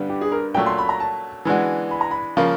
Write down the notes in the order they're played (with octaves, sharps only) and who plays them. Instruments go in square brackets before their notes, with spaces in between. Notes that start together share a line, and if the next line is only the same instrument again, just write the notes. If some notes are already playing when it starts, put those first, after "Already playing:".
Already playing: [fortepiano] G2 D3 G3 B3
[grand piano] G4
G#4
A#4
[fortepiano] A#2 F#3 A3 [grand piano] G5
[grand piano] C6
B5
A#5
A5
[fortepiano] E3 G#3 B3 D4 F#4
[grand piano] B5
A#5
B5
[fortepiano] C#3 F3 A#3